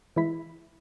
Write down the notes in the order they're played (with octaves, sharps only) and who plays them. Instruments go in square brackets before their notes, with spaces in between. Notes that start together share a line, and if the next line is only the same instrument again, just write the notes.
[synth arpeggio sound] E3 G#3 E4 B6